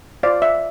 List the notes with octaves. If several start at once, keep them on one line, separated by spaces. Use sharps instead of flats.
F4 C5 D5 F5
E5